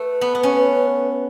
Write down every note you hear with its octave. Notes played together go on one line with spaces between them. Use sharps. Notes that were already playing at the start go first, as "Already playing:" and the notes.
Already playing: A3 B4
B3
B3
C#4